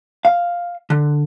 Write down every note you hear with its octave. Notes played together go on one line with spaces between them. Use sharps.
F5
D3